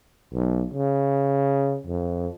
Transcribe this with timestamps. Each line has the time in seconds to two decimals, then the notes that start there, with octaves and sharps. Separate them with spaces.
0.33 B1
0.74 C#3
1.86 F2